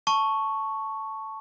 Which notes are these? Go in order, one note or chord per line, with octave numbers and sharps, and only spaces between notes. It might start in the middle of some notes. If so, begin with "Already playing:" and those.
A5 C#6